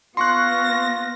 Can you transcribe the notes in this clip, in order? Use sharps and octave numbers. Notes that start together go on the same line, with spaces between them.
B3 F4 C6 C#6 F#6 A#6